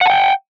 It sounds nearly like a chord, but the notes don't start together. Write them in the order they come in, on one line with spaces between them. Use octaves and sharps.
F#5 A5 G5